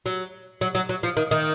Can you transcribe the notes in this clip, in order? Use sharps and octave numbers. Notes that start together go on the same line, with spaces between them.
F#3
F#3
F#3
F#3
F3
D#3
D#3